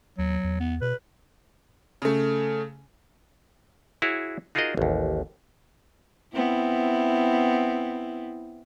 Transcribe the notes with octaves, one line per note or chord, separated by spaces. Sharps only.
D#2 F#3
E2
B3
B2 B4
C#3 A3
E4 F#4 G#4 C#5
D#4 F4 F#4 G#4 A#4 D#5
A1 D#2
B3 C4 E4